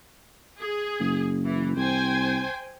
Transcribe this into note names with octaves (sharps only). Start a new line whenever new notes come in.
G#4
F#1
E3
C2 C5 G5 G#5